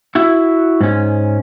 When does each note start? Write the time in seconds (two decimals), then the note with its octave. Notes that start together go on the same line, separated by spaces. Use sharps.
0.15 E4 F#4
0.81 G#2 C#4